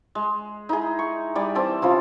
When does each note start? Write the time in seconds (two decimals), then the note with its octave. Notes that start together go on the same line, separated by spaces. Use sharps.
0.15 G#3
0.69 D#4 E4 G#4
0.99 C#6
1.35 G3 D5 G#5
1.55 E3 C4 A5 D6
1.82 C#3 F3 F4